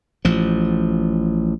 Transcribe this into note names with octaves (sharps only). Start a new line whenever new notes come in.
A1 F3